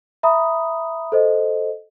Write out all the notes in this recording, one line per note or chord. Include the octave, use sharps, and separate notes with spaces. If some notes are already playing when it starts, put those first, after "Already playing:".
E5 A#5 B5 D#6
A4 C5 D#5